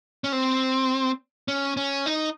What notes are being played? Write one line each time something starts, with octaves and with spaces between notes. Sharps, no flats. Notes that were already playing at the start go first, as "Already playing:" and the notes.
C#4
C4
C#4
C#4
D#4